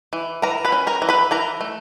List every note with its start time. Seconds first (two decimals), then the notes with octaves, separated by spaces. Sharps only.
0.13 E3
0.42 E3 A#4 A#5
0.65 B4 B5
0.72 C#4
0.87 A#4 A#5
1.02 E3
1.09 B4 B5
1.31 E3 A#4 A#5
1.61 A3